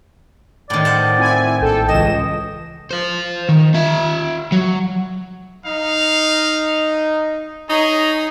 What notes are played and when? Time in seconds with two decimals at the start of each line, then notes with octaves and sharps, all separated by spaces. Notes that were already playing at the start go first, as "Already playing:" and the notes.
0.70 A2 D#3 D5
0.85 C5 F#5 A5
1.17 C4 E4 G#5
1.61 A#1 A4 G5
1.89 C#2 E3 D#5 E7
2.91 C5 F5
3.49 D#3
3.75 F4 E5
4.52 F#3
5.66 D#4 F5
7.69 D#4 G#4 C#5 A#5